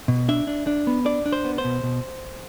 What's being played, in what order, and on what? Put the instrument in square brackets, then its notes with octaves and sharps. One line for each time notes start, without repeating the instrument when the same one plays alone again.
[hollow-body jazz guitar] B2
D4 E5
D4
D4
B3
D4 D5
D4
C5
B3
C5
B2
B2